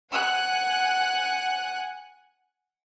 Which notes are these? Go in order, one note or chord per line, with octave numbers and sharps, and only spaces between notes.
F#5 G#5 F#6